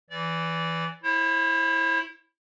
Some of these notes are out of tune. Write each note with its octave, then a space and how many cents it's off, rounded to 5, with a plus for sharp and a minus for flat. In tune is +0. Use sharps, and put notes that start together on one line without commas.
E3 +5 D5 -20
E4 +0 C5 +45